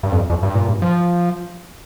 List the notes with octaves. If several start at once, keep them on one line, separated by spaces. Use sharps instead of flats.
G2
F2
F2
G2
A#2
G2
F3